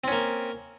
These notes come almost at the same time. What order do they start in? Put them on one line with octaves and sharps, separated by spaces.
C4 C#4 A#3